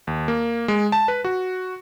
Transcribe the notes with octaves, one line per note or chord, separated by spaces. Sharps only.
D#2
A#3
G#3
A5
B4
F#4